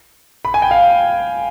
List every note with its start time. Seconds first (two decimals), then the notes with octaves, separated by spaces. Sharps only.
0.45 B5
0.54 G#5
0.62 G5
0.71 F5